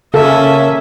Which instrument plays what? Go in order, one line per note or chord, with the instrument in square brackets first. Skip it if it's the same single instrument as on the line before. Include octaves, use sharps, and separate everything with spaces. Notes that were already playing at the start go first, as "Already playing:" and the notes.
[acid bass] C#3 [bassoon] A#3 [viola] C#4 E5 [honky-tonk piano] A4